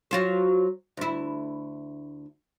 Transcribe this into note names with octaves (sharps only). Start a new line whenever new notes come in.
F#3 F4 C5
D2 E4